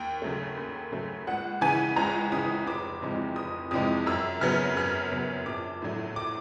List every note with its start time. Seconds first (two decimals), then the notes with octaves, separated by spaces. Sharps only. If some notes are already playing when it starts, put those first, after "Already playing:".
Already playing: D#2 G5
0.22 C#3 F#3 A3
0.57 D#2
0.92 C#3 F#3 A3
1.27 C#2 F#5
1.61 C#3 E3 G#5
1.96 C#2 A#5
2.32 C#3 E3 D#6
2.67 F1 D6
3.02 F2 C3 E3 G#3
3.36 F1 D#6
3.71 F2 C3 E3 G#3 D#6
4.06 F#2 E6
4.41 C#3 F#3 B3 F6
4.77 F#2 F6
5.12 C#3 F#3 B3
5.46 A#1 D6
5.82 A2 F#3 A3
6.16 D6